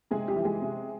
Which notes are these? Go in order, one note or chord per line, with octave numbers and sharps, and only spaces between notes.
C3 G#3 G#4
G3 G4
E3
G#3 G#4
C3